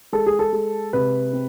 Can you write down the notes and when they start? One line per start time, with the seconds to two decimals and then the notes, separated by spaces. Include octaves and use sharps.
0.13 G#3 A4
0.26 G#4
0.39 A4
0.53 G#3
0.93 C3 B4
1.33 C4